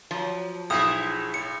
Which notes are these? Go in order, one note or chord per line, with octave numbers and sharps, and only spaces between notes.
F3 F#3
B1 G#3 A3 E4 D#6
A2 C#7